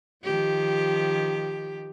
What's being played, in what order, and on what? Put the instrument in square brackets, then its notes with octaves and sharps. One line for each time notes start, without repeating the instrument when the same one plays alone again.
[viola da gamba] D#3 F3 G4